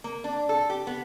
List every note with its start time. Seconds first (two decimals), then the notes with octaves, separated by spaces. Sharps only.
0.04 A#3
0.24 D4
0.49 A4
0.70 G4
0.87 B3